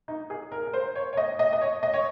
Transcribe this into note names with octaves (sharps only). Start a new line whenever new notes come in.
D#4
G#4
A#4
A#4
C5
C#5
C#5
D#5
D#5
D#5
C#5
D#5
C#5